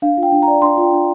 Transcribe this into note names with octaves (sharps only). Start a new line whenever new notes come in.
D4 F5
F4
G5
D4
A#5
D5
D4 C6
F4 G5
D4